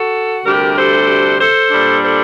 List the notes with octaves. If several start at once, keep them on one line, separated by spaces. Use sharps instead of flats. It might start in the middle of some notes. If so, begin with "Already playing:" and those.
Already playing: F#4 A4
D2 C3 G3 D4 G4 A#4
A4 C5
A4 C5
A#2 G3 D4
A4 C5